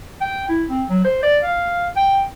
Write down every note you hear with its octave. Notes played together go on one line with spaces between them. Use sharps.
G5
E4
C4
F#3
C5
D5
F5
G5